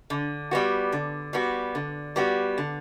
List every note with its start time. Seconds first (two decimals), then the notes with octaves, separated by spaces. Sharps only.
0.10 D3
0.51 G3 B3 F#4
0.92 D3
1.33 G3 B3 F#4
1.75 D3
2.16 G3 B3 F#4
2.58 D3